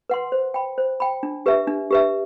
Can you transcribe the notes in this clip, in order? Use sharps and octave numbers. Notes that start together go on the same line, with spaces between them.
B4 F#5 C6
C5
G5 B5
C5
G5 B5
D4
G4 B4 E5
D4
G4 B4 E5